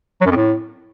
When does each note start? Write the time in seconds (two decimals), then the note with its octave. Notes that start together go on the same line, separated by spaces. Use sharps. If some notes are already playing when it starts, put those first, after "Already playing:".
0.21 F#3
0.26 F#2
0.31 F2
0.36 A2